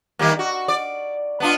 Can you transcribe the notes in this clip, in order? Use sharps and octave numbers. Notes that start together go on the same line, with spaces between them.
D#3 G3 A#3
F#4
D5
B3 D4 F4